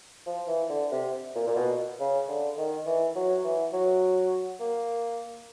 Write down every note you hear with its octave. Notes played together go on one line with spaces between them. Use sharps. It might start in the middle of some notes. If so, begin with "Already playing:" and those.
F3
E3
D3
C3
A#2
A#2
B2
C#3
D3
D#3
E3
F#3
E3
F#3
A#3